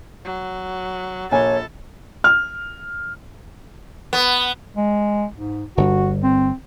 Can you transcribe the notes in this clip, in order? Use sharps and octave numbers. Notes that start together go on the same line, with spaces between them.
F#3
A#1 A4 C#5 G#5
F6
B3
G#3
G#2
G1 F#4
C4